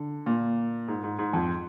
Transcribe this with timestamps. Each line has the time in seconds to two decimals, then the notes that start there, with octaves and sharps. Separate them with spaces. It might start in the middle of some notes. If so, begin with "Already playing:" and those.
Already playing: D3
0.26 A#2
0.88 G#2
1.03 G#2
1.19 G#2
1.33 F2